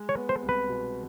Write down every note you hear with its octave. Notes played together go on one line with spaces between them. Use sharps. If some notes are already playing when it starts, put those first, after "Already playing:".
Already playing: G#3
C#5
B3
C5
C2
B4
B2